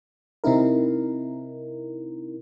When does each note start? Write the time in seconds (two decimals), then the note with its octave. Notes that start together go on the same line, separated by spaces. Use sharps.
0.44 C3 C4 D#4 E4 A#4